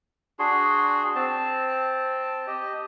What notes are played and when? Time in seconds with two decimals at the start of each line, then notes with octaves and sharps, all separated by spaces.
0.39 D4 F#4 G#4 C6
1.15 C4 A5
2.47 G4 D#5